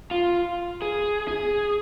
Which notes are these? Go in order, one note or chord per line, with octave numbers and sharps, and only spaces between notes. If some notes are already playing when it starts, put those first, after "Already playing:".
F4
G#4
G#4